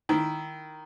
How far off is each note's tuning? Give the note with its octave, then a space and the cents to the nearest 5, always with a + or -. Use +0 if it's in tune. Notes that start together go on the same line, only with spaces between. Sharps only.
D#3 -5 E4 +0